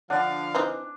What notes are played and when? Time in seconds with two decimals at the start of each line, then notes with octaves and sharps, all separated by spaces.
0.10 D3 F3 D4 F5 F#5
0.55 E3 C4 D#4